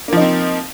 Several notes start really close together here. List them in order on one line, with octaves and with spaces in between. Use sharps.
A#3 F3 D#4 C4